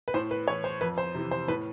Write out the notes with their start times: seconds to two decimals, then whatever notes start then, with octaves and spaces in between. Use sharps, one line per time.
0.08 B4
0.14 A2 C5
0.31 B4
0.47 E3 C#5
0.64 C5
0.81 F2 B4
0.98 C5
1.15 C3 E3
1.31 C5
1.48 A2 B4